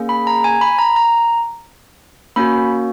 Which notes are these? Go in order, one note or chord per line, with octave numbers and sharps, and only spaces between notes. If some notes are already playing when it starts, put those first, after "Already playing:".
Already playing: A#3 C#4 G#4
B5
A#5
G#5
B5
A#5
A#5
A#3 C#4 F#4 B5